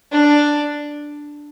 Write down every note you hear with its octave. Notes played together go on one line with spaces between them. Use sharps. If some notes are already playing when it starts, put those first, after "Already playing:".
D4